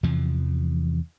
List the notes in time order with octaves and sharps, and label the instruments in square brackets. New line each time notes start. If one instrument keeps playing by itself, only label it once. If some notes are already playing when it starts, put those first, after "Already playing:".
[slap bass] E2 C3 E3 F3